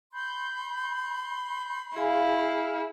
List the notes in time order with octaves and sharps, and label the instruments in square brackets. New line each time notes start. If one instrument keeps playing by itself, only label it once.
[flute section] B5 C6 [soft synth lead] G6
[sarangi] E4 [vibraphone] G#4 G#5 [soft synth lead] F5